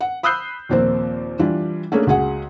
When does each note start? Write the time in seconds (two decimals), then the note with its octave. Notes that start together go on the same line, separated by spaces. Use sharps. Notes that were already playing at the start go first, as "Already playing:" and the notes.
0.01 F#5
0.23 B5 D#6 E6 F#6 G6 C7
0.69 D#2 A#2 F3 A#3 C4
1.39 E3 G3 D4 F4
1.92 A3 A#3 C#4 D4 G#4
2.07 C#2 F#4 G#4 F#5